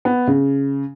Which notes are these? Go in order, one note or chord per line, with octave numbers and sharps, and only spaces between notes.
B3
C#3